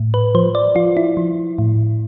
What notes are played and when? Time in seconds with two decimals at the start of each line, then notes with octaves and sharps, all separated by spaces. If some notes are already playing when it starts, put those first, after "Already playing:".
Already playing: A2
0.14 B4
0.35 F3 C5
0.55 D5
0.75 F3 F4
0.97 E4
1.17 F3
1.58 A2